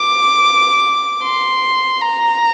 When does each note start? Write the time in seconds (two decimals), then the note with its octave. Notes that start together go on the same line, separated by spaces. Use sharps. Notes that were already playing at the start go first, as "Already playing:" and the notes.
Already playing: D6
1.23 C6
2.01 A#5